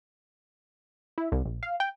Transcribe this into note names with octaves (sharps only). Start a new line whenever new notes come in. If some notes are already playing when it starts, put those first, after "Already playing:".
E4
C2
A#1
F5
G5